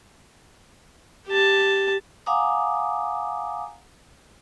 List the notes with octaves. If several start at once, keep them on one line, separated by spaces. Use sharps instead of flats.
G4 A5
F5 F#5 G#5 A#5 D6 D#6